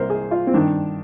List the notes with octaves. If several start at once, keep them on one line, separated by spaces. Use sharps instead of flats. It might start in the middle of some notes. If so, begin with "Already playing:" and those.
Already playing: C2 C3 A#4 C5
G#4
F4
C4
G2 D#3 D4